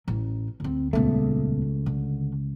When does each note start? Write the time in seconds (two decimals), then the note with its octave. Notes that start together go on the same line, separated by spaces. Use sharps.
0.08 A1 C#4
0.60 D2 C4
0.93 D#1 C#2 A3 B3
1.86 D3